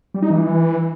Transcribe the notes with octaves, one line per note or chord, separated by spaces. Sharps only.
G3
D#4
E3